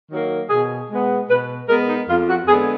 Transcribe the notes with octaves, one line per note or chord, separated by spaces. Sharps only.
D#3 F#3 A#3
B2 G#4
G#3 B3
B2 B4
G#3 B3 A#4
D#4
F2 F4
F#4
D3 G#3 B3 G#4